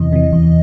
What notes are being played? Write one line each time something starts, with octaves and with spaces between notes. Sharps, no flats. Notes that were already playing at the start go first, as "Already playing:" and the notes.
Already playing: E2 C3 E3 D#5
C3 E3
E2